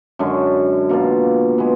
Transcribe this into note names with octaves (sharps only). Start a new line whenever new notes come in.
F#2 D3 G#3
B2 A#3 F4
G#3 B3